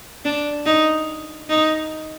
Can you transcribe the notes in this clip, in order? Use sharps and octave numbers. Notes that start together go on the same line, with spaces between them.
D4
D#4
D#4